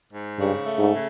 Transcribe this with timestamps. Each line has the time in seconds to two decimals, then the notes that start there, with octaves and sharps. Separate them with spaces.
0.13 G#2
0.39 G2 C#3
0.65 A3
0.78 G#2
0.92 C#3